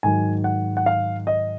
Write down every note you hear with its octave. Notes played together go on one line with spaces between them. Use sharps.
G#2 D#3 F#3 G#5
F#5
F#5
F5
D#5